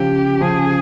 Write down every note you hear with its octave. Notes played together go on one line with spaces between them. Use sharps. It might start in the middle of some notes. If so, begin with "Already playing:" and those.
Already playing: C#3 F3 G4
C#3 F3 G#4